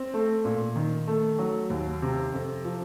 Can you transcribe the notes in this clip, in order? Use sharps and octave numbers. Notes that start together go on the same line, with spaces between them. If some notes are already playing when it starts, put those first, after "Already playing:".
Already playing: C4
A3
A#2
D#3
A3
F#3
D#2
C3
F2
F3